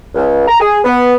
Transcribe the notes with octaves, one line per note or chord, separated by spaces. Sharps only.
C#2
A#5
G#4
B3